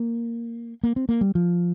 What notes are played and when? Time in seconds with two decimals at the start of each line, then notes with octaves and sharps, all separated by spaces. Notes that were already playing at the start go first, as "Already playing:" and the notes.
Already playing: A#3
0.84 A#3
0.96 C4
1.09 A#3
1.21 G3
1.35 F3